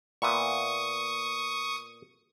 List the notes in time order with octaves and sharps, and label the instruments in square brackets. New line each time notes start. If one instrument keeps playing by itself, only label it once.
[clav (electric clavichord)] A#2 B3 E5 [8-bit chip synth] C#6 D#6